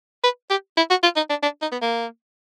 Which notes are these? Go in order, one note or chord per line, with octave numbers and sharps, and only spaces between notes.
B4
G4
E4
F#4
F4
D#4
D4
D4
D#4
B3
A#3